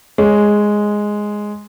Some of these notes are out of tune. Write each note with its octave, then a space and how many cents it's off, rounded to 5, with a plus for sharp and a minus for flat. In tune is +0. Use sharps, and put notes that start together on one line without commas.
G#3 +0 C#5 +0